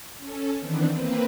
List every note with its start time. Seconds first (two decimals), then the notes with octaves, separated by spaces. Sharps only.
0.18 C#4 A4
0.60 D#3 E3 B3 C4 D4
0.92 A#3 C4 B4